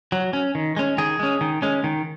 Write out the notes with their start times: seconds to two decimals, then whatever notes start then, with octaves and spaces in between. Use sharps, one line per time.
0.12 F#3
0.33 C#4
0.55 D#3
0.77 G#3 C#4
0.98 D#3 G#4
1.19 G#3 C#4
1.41 D#3
1.62 G#3 C#4
1.84 D#3